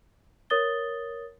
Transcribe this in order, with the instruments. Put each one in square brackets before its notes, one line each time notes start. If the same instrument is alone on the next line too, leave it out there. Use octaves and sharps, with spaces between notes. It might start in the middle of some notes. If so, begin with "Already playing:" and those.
[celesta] A#4 C#5 D#6 A6 G7